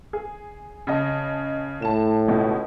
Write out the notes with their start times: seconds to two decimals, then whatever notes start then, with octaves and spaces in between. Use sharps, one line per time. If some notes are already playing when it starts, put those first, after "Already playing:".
0.13 G#4
0.87 C#3 D#5 A5
1.82 A2 A5 E7
2.28 C#2 B2